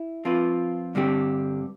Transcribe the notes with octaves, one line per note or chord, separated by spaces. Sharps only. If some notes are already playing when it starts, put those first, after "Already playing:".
Already playing: E4
F3 C4 F4 B4
G2 D3 G3 C4 G4